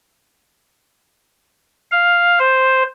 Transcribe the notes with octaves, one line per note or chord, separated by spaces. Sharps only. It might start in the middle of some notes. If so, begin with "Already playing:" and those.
F5
C5